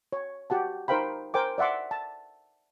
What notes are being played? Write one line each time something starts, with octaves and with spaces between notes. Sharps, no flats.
C#5
F#4 G4 F#5 A5
D#4 A#4 C5 F5 G5 B5
A#4 C5 G5 G#5 D6
D5 E5 F#5 C6 D6
A5